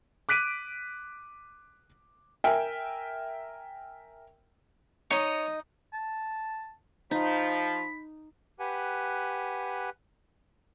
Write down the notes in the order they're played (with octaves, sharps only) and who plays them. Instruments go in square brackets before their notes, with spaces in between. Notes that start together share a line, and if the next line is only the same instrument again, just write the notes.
[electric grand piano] D6 F#6 B6 D7 D#7
[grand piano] A#4 E5 G5 G#5
[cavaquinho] D#4 D#5 [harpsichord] C#5
[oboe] A5
[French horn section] F3 [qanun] D#4 [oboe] B5
[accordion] G4 B4 F#5 G#5